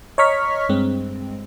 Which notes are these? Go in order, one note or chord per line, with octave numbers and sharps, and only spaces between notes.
C#5 D#5 A#5 C#6 F6 B6
G2 G#3 C4